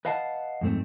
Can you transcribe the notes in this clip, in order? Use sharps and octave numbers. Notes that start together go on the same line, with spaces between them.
B4 D#5 F5 F#5 A5
F2 G#2 A3 C4